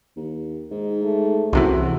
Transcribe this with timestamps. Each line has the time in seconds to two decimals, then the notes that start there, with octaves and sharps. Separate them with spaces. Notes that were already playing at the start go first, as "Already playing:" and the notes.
0.17 D#2
0.71 G#2 D#4
1.03 A3
1.53 F#1 C2 C3 E3 F#4